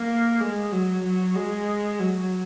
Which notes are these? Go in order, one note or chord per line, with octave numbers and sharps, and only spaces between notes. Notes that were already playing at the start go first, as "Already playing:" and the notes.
Already playing: A#3
G#3
F#3
F#3
G#3
F#3